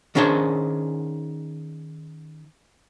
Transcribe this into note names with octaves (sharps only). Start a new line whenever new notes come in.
D#3 C#4 D4 G#4 C5